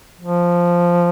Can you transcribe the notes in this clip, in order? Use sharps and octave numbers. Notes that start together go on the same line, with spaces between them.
F3